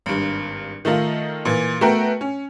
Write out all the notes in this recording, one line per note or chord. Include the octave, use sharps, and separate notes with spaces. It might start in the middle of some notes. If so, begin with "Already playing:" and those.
G#1 G2
D#3 A3 D#4 F4
A#2 E3
A3 B3 F#4 A#4 G5
C#4